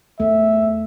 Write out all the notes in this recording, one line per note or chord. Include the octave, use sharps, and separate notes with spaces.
E2 A3 E5